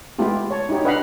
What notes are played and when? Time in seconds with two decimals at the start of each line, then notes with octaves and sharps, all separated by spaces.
0.19 G#3 A3 B3 E4 F4 G4
0.51 C#5 A5
0.69 D#4 E4 F#4 G4 C#5
0.84 D4 B4 D#5 F5 F#5 B5